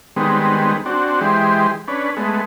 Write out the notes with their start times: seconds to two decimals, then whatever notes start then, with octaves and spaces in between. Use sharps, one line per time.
0.16 D#3 G3 G#3 B3 C4
0.86 C4 D4 F#4
1.21 E3 G#3 G4 C5
1.88 C#4 D4 B4
2.17 G#3 A3 B3